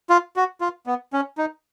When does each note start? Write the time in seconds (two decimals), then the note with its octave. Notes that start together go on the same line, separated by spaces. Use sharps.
0.10 F4
0.36 F#4
0.61 F4
0.87 B3
1.13 C#4
1.38 D#4